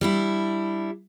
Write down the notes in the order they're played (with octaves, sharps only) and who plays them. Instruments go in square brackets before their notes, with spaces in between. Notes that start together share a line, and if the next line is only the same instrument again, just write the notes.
[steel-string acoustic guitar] G3 D4 E4